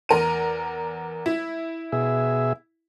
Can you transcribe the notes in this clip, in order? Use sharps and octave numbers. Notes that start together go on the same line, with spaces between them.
E2 A#4 D#7
E4
B2 G#4 E5